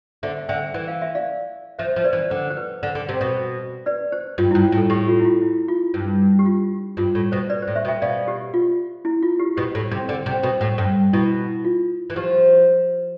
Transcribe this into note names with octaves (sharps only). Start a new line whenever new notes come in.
D3 C5 E5
D3 E5 G5
E3 G5
F5
E5
D5 F5
F3 C5 E5
F3
B4 D5
E3
D3 C5
C5
B4
D3
D3
C3
B2
B4 D5
C5
G2 F4
G2 E4
F4
A2
A4
A2 G4
F4
E4
F4
E4
F4
G2
G4
F4
G2 F4
A2
B2 C5
B4 D5
C5
A2
C5 E5
B2
E5 G5
B2 D5 F5
G4
F4
E4
F4
G4
B2 G4
A2
C3
D3
C3
B2
A2
G2
B2 E4
F4
E3
F3 G4